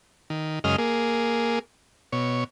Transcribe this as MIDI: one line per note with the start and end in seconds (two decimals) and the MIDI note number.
0.30 0.59 51
0.64 0.76 42
0.64 0.76 49
0.64 0.76 56
0.64 0.76 75
0.64 0.76 89
0.78 1.59 58
0.78 1.59 68
2.12 2.44 47
2.12 2.44 73